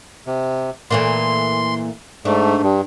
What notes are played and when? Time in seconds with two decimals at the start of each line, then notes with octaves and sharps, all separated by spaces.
0.27 C3
0.91 A#2 E3 A3 C6
2.25 G#2 A3 D4
2.63 G2